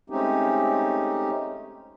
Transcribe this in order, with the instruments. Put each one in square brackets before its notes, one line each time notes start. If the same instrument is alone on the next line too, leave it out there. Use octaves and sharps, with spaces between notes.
[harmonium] G#3 A3 C4 C#4 D#4 G4